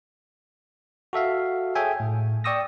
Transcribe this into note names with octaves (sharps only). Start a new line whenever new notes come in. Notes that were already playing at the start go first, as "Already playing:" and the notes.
F#4 A4 E5 F5
G#4 A4 C#5 E5 G5 G#5
A2
D5 G5 C#6 D#6 E6 A#6